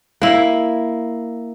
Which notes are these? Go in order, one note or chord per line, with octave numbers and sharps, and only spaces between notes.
A#3 E4